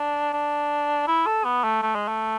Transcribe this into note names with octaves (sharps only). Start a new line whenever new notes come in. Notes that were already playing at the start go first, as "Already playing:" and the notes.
Already playing: D4
D4
E4
A4
B3
A3
A3
G#3
A3